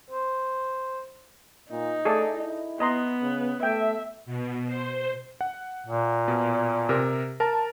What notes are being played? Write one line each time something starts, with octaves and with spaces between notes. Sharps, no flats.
C5
A#2 D#4
A3 G#4 A4 D5
E4
B3 D#5 A#5 C6
C#3
A3 E5 G5
B2
C5
F#5
A#2
B2
C3 A#4
A#4 A5